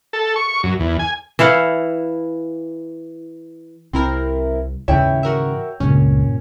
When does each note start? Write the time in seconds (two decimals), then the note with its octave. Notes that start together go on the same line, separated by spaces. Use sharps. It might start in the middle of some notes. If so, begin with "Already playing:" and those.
0.13 A4
0.36 C#6
0.63 F#2
0.80 E2
0.99 G#5
1.39 E3 E4 F5 F#5
3.93 C2 C4 E4 A#4
4.88 D#2 G#2 C#3 E3 E4 C#5 E5 G5
5.23 F#4 A#4 E5
5.80 C#2 G2 A#2 C4 C#4